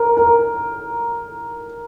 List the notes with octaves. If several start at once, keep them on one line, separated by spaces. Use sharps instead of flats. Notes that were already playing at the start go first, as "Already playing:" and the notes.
Already playing: A#4
A#4